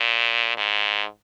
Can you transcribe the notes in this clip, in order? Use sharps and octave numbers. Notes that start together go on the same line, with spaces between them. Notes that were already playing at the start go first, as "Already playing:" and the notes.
Already playing: A#2
G#2